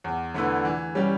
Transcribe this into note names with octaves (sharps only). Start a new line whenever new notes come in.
E2
D3 A3 E4 B4
E3
G3 C#4 G4